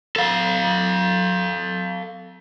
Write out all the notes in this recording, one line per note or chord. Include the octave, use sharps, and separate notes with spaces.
A4 F5